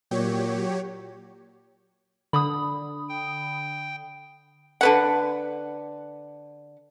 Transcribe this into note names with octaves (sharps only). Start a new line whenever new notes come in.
A#2 F#3 G4 C#5
D3 B5 D#6
G5
D3 B4 F#5